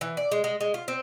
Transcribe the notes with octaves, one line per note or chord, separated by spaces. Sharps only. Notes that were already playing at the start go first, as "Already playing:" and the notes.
E3
D5
G#3
G#3
G#3
F4
C4